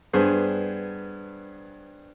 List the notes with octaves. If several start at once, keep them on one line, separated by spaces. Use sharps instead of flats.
G2 B3 D4 G#4 C5